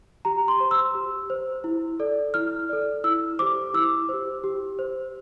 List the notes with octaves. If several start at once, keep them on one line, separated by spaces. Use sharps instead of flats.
G4 A#5
C6
C5
E6
G4
C5
E4
A4 D5
E4 F6
A4 D5
E4 E6
G4 C5 D6
E4 E6
G4 C5
G4
C5